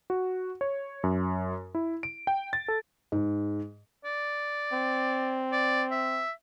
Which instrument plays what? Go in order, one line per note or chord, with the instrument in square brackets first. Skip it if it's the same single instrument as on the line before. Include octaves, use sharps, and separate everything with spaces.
[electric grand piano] F#4
C#5
F#2
E4
D7
G5
A6
A4
[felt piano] G#2
[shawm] D5
[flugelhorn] C4
[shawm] D5
E5